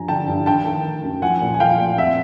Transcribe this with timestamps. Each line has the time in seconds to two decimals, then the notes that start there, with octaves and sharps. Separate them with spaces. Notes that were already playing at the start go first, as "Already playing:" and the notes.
Already playing: G2 F3 G#5 A#5
0.08 D3 G5 A5
0.28 G2
0.46 D#3 G5 A5
0.66 D#3
0.85 D#3
1.04 F#2
1.22 F3 F#5 G#5
1.41 A#2
1.54 G#5
1.60 F3 F5 G5
1.80 A#2
1.98 F2 E5 F#5